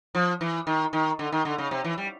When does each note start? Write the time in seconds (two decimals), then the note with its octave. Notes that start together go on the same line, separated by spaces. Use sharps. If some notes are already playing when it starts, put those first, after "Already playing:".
0.15 F3
0.41 E3
0.67 D#3
0.93 D#3
1.19 D3
1.32 D#3
1.45 D3
1.58 C#3
1.71 C3
1.84 E3
1.98 G3